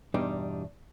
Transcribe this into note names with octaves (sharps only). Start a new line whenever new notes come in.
E2 G2 B2 G3 D4 D#4